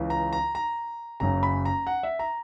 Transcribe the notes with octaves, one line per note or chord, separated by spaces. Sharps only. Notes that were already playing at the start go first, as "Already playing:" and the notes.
Already playing: C#2 C#3 E3
A#5
A#5
A#5
F#1 F#2 C#3 A#5
B5
A#5
F#5
E5
A#5